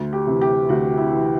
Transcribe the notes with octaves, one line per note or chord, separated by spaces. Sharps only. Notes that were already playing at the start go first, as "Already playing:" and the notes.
Already playing: D2
G4
C3 E3
G4
D2 F#4
E4
C3 E3